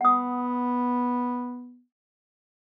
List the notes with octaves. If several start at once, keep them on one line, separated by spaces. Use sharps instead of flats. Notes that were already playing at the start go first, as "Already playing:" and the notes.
B3 F#5 D#6